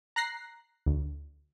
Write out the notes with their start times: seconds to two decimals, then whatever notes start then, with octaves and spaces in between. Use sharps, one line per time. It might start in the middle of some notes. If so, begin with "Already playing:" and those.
0.16 A#5 F#6 A#6 C7
0.86 D2